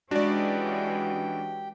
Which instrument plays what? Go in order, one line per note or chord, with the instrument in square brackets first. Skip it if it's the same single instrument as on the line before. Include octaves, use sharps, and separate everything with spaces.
[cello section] E3 G#3 C#4 [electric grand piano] D4 D5 [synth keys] F#4 [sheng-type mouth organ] G4 G5